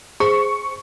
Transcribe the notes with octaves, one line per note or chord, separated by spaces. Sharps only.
G#4 C5 C#6